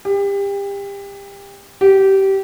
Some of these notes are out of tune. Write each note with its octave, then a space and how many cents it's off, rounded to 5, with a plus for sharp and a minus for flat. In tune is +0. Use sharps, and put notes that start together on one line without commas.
G4 +30
G4 -20